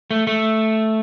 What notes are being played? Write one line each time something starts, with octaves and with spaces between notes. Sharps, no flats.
A3
A3